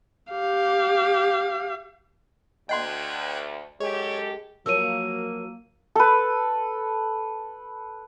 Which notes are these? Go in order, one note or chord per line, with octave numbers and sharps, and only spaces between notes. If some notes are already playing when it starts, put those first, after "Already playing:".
G4 F5
D2 D#5 F#5 G5 C6 F#6 G#6
F#2 G#3 G4 A4 C#5
F3 F#3 A#3 A#4 C#5 E6 D#7
A4 B4